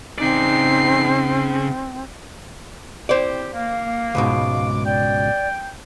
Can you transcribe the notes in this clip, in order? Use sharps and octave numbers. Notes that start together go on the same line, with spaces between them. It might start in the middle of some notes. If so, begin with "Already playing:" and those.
C#3 C4 D#4 D5 C7
C4 E4 G4 C5 D5
A#3 F5
C#2 G#2 B2 G#3 D6
D5 G5